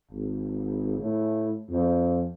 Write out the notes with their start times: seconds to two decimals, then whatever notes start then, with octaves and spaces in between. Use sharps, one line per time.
0.11 G#1
0.99 A2
1.70 F2